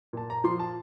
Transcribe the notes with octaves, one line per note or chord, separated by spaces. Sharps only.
A#2 A5
A#5
F3 C6
A5